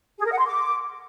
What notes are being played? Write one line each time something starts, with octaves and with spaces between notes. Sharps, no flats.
G#4
A#4
F#5
C6
D6